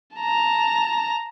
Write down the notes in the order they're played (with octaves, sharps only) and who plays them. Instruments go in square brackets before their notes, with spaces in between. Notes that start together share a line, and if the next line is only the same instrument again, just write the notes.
[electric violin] A5 A#5